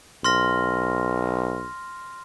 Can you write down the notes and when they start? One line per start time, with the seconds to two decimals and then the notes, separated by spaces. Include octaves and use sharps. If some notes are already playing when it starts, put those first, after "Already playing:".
0.24 B1 C6 F6 A#6